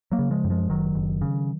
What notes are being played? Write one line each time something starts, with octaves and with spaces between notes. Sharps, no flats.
F#3 A#3
C#3
F3 G#3
F#2
F3 G#3
F#1 D#3 F#3
F#1
C#3